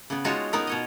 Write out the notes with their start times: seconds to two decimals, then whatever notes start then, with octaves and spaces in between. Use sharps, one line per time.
0.10 C#3 B3
0.25 G#3 D#4 F4 F#4 C#5 A5
0.53 B3 D#4 A#4
0.67 B2 C#5 D#5